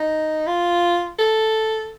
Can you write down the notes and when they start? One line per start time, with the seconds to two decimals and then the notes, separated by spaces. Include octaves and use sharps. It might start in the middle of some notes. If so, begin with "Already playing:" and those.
Already playing: D#4
0.47 F4
1.19 A4